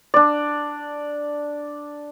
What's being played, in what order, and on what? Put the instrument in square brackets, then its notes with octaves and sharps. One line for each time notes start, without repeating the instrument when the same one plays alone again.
[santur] D4 D5